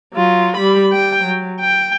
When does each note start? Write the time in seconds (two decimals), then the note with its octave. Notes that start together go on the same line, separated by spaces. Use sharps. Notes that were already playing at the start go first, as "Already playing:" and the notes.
0.14 F#3 F4
0.57 G3 B5
0.92 G3 G5
1.24 F#3
1.61 G5